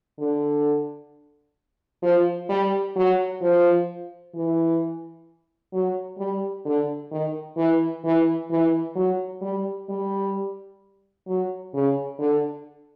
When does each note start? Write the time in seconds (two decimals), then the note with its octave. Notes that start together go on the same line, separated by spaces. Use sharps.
0.18 D3
2.02 F3
2.49 G3
2.96 F#3
3.41 F3
4.35 E3
5.73 F#3
6.18 G3
6.65 D3
7.11 D#3
7.57 E3
8.04 E3
8.50 E3
8.95 F#3
9.42 G3
9.89 G3
11.27 F#3
11.73 C#3
12.19 D3